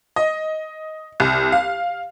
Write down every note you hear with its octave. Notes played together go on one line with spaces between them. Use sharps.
D#5
C2
F5